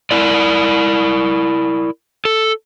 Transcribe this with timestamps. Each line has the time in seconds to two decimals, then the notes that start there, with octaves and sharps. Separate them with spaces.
0.11 E4 A#4 D5
2.25 A4